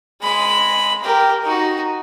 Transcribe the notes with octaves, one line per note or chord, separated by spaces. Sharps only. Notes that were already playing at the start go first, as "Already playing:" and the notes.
G#3 B5
G4 A#4
D#4 F#4